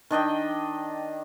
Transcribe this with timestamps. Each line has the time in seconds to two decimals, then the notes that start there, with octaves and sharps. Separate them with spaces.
0.11 D#3 D4 D#5 G5